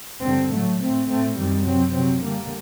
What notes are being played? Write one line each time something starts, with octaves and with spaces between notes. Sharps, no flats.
G2 D3 G3 C4
A2 F#3 A3
A2 A3 C4
A2 A3 C4
F#2 D#3 G3 C4
C3 F#3 C4
C3 F#3 C4
D3 G3 A#3